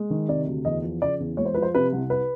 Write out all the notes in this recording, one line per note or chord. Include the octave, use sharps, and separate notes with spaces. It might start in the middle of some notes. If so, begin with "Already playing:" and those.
Already playing: G#3
D#3
C3 D5
D2
E2 D#5
F3
C#3 D5
E2
G#3 C#5
C5
F3 B4
C5
C3 B4
C2
B4